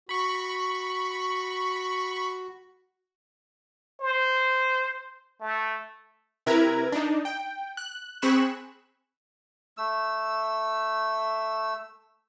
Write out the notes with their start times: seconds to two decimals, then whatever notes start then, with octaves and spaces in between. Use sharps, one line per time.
0.09 F#4 B5 C#6
4.01 C5
5.41 A3
6.46 C3 E4 A#4 B4 A#5 G#6
6.92 D4 D#4
7.25 G5
7.77 F#6
8.22 C4 G#4 B5 C#6 F#6 E7
9.77 A3 E6